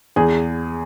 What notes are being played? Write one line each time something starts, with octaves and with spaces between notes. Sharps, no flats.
E2 G#4